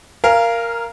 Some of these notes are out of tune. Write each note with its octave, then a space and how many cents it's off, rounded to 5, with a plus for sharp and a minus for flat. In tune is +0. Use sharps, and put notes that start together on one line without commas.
A#4 +0 F5 -20 G#5 +5